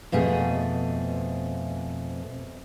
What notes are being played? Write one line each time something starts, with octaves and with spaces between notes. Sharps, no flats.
F2 B2 A3 G#4